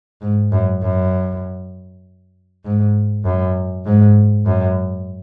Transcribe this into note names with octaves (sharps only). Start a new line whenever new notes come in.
G#2
F#2
F#2
G#2
F#2
G#2
F#2